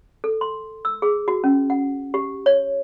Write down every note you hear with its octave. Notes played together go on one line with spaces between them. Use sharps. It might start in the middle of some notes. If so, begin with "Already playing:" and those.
A4
C6
E6
G#4
F#4
C#4
F#5
G4
C#5